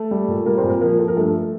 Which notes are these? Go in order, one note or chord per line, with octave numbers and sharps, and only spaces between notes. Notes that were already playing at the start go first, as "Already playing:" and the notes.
Already playing: A3 A4
G3
A#2
G3 A#3 A#4
C4 C5
A#2
A#3 A#4
F3 A#3 A#4
F3 A4
A#4
G2 A3 A4